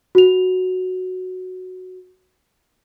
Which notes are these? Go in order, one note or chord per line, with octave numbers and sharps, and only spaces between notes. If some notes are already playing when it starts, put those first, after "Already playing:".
F#4 F7